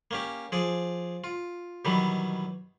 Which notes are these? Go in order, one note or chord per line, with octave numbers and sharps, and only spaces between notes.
A#3 C#4 G4
F3 G#4 D5
F4
B2 D#3 E3 F#3 G3